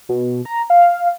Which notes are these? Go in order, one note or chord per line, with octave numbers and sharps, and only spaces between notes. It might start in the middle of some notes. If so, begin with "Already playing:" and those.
B2
A#5
F5